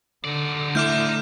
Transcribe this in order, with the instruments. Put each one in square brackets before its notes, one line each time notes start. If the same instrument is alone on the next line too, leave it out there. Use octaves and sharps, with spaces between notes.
[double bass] D3 [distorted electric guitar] D#4 D5
[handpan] A3 E4 E5 [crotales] D6 F6 G6